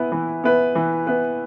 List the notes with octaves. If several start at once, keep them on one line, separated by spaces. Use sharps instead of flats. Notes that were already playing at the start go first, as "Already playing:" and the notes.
Already playing: E3 B3 E4 B4
E3
B3 E4 B4
E3
B3 E4 B4